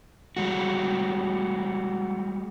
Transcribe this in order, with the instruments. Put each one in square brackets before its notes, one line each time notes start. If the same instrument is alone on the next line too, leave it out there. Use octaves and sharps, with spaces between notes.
[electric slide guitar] G3 G#3 F#4